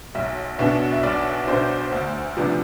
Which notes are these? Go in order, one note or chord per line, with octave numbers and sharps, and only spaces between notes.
B1 E5
B2 B3 D4 E5
E5
B1 D5
B2 B3 D4 C5
D2
C3 F3 B3 D4